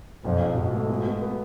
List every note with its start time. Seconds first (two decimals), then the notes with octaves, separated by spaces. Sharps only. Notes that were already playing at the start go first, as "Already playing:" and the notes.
0.25 B1 F2
0.41 B1
0.56 G#2 B2
0.73 A3
0.89 B2
1.06 B2
1.21 B3